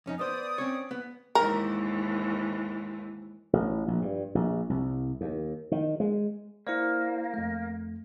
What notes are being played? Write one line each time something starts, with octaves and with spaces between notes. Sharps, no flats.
F2 C#4 D#4
B3 C5 D5 D#6
C4 C#4 C#5
B3
D#2 G#2 E3 A#4
A1
A#1
G2
A#1
C2
D#2
D#3
G#3
A#3 E4 C5 D5
F2 A3